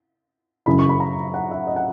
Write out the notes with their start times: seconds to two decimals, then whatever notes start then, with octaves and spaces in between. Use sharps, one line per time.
0.66 F#2 C#3 E3 B5
0.79 C#6
0.89 B5
1.00 A#5
1.34 F#5
1.51 E5
1.67 D#5
1.76 F#5